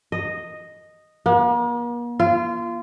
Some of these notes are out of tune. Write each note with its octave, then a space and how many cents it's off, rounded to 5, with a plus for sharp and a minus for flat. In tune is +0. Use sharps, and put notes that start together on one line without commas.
D#5 -5
A#3 +45
F4 -25